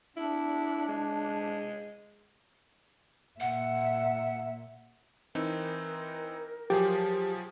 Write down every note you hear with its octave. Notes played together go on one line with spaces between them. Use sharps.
D4 E4
G#3
A#2 E5 F#5
E3 C4 D#4 A#4
F3 F#3 G4 G#4